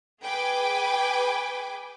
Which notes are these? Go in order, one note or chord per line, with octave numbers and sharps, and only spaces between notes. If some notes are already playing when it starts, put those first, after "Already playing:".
G#4 B4 G5 G#5 D6